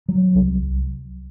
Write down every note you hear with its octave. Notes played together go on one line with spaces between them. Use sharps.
F#3
C2